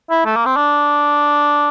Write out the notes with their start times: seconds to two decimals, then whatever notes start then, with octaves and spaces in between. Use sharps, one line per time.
0.10 E4
0.25 A3
0.36 A#3
0.46 C4
0.56 D4